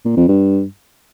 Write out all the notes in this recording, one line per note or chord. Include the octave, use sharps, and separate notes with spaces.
A#2
F2
G2